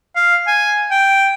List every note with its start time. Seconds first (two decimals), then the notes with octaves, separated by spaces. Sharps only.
0.16 F5
0.47 G#5
0.91 G5